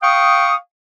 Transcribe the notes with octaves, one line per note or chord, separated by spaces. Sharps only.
F5 G5 C#6 D#6